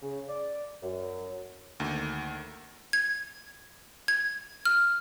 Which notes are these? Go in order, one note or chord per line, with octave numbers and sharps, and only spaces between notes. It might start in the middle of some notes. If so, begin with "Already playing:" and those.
C#3
D5
F#2
D2 D#3 A#3
G#6
G#6
F6